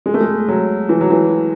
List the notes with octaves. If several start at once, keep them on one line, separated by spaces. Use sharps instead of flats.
G#3
A3
G#3
F#3
E3
F#3
E3